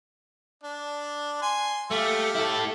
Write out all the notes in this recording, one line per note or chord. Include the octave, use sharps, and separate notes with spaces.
D4
G#5 C6
A3 G4 F5
E4 A4